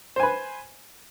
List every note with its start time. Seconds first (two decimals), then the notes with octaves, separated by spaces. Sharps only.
0.16 C5
0.20 G#5
0.23 B4